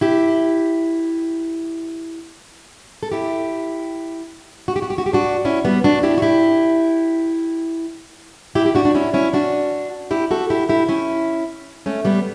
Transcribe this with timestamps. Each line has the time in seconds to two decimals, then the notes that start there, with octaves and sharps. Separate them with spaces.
0.01 E4 G4
3.03 A4
3.12 E4 G4
4.68 F#4
4.76 G4
4.82 F#4
4.90 G4
4.98 F#4
5.06 G4
5.13 D4 F#4
5.45 C#4 E4
5.65 G3 B3
5.84 D4 F#4
6.03 E4 G4
6.18 F#4
6.22 E4 G4
8.55 E4 G4
8.66 G4
8.75 D4 F#4
8.85 D4
8.95 C#4 E4
9.14 C#4 E4
9.33 D4 F#4
10.11 E4 G4
10.31 F#4 A4
10.50 E4 G4
10.69 E4 G4
10.89 C#4 E4
11.86 A3 C#4
12.05 G3 B3